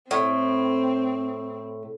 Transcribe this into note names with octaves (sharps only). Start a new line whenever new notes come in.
A2 C4